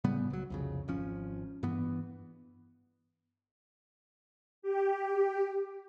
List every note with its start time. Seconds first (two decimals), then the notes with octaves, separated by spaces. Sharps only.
0.04 A2 C#3 G3 B3
0.30 C#2 F#3
0.50 C2 F2 C#3
0.88 G#1 F3 C#4
1.63 G2 E3 B3
4.62 G4